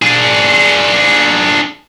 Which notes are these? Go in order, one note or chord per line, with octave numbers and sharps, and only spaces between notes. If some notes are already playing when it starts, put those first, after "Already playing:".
D4 G#4